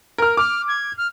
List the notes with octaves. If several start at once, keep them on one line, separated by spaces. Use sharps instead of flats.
A#4 F6
D6 F6
G#6
F6